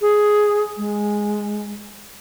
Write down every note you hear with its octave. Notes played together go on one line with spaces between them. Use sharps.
G#4
G#3